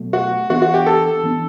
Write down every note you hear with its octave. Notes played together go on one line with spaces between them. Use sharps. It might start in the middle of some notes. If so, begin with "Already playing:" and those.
Already playing: B2 F#3 A3
F#4
E3 B3 D4 F#4
F#4
G4
A4
E3 B3 D4